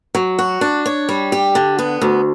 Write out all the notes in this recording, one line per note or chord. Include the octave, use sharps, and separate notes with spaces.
F#3
F#4
D4
C#5
G3
G4
D3
B3
D2